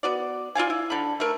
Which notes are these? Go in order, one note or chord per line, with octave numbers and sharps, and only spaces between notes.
B3 F#4 D5
F4 D5 F5 G#5
E4
D3 B5
A3 A#4